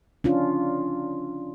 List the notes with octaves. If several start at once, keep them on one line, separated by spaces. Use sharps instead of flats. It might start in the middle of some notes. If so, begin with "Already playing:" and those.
C#4 D4 F4